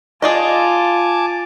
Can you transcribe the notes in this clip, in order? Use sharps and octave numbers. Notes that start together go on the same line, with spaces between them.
F4 G#4 D5 D#5 G#5 A5 D6